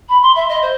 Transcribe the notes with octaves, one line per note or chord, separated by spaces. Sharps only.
B5
C6
E5
D#5
C5